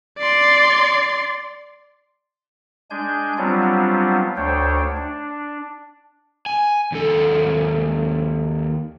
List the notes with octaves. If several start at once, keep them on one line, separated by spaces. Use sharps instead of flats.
D5 C6
G#3 D4 G#5 G6
F#3 G3 B3 C4 D4 F4
D2 D4 C5 C#5 G5
D4
G#5
D#2 A4